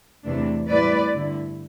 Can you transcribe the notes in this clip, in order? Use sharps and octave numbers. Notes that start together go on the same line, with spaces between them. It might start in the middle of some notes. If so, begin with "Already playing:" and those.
E2 C3 E3 A3 D4
A2 G3 C4 E4 B4 D5
G2 D3 A3 E4